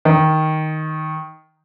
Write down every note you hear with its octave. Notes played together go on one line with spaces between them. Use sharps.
D#3